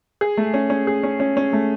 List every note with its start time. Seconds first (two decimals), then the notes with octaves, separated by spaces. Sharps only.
0.21 G#4
0.37 A3
0.54 C#4
0.70 C#4
0.87 G#4
1.03 C#4
1.20 C#4
1.37 C#4
1.53 A3